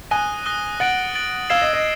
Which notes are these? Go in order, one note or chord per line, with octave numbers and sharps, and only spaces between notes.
G#5 D#6 F#6 A#6 D#7 G7
D#6 F#6 A#6 D#7 G7
F#5 A6 D7 F#7
A6 D7 F#7
F5 E6 G#6 C7 E7 G7
D#5
D#5